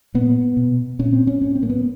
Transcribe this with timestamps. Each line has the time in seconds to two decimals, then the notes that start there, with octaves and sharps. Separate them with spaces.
0.14 A#2 B3
0.57 B2
0.99 A#2 C#4
1.13 C4
1.27 C#4
1.41 A2 C#4
1.55 C4
1.63 A#3
1.69 B3